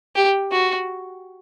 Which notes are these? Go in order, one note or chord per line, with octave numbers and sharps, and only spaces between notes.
G4
F#4